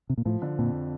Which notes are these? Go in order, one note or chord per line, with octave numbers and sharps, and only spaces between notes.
C3
A#2
A2 F3
D3
F2 A#2